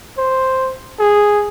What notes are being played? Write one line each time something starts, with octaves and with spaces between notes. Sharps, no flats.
C5
G#4